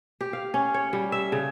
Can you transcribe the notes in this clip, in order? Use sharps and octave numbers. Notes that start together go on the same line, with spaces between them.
G4
F5
C#4
C#5
G3
E5
C#3